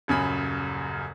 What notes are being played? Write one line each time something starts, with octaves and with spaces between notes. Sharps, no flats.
D#1 F#2 C#3 G#5 B5